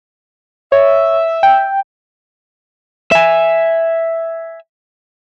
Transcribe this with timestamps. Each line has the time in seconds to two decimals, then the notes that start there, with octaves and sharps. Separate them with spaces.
0.72 C#5 E5
1.43 G5
3.12 E5 G#5